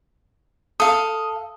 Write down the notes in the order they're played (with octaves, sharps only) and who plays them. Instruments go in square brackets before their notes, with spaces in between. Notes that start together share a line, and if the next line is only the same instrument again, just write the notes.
[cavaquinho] A4 F5 [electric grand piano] D#6